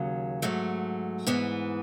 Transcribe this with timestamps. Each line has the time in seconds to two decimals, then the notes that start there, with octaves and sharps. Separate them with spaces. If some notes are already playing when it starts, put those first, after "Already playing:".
Already playing: D#2 C#3 F#3
0.42 G#2 F#3 A3
1.27 G#2 E3 B3